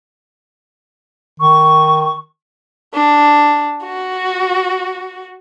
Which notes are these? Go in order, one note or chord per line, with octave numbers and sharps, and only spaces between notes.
D#3 C#6
D4
F#4